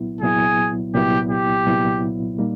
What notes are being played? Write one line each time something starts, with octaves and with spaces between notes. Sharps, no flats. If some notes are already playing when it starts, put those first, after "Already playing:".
Already playing: C2 A#2 F#3 B3 E4
C2 A#2 F#3 B3 E4 G#4
C2 A#2 F#3 B3 E4 G4
G4
C2 A#2 F#3 B3 E4
A#2 G3 A#3 D#4